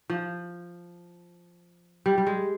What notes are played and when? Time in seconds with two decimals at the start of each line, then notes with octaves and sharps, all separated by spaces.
0.10 F3
2.06 G3
2.18 G3
2.27 G#3